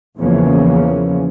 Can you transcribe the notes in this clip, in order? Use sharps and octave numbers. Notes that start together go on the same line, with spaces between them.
E2 C#3 E3 F3 A#3 C#4